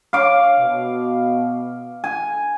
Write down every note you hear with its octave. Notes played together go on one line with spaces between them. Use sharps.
C#5 F5 D6
B2
G#5